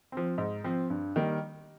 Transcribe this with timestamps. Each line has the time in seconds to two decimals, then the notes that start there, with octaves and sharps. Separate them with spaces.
0.12 F3 C4
0.38 G#2
0.64 F3 C4
0.90 G2
1.16 D#3 G3 A#3